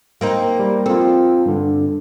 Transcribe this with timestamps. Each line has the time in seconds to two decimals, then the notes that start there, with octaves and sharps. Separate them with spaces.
0.21 A#3 C4 D#4
0.59 G3
0.86 C4 F4 A4
1.46 G2 D3